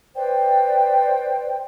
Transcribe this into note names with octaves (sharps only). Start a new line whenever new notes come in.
B4 C5 D5 G5